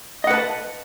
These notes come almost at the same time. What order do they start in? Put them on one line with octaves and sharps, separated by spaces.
D#5 F#5 B4 A5